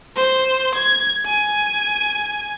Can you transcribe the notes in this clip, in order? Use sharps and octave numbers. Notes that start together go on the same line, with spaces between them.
C5
G#6
G#5